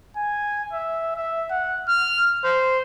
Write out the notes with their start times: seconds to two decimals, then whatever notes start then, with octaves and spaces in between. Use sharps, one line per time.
0.17 G#5
0.73 E5
1.16 E5
1.50 F#5
1.88 F6
2.44 C5